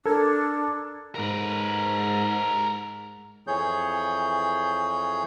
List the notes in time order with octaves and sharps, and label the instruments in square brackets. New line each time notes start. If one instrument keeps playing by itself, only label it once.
[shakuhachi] D4 [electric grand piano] A4 A#4 G#6
[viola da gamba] G#2 [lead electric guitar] A#4 B4
[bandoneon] F2 E3 G#4 C#5 G6